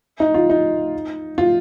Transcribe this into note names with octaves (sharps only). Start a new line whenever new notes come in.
D#4
F4
D#4
F4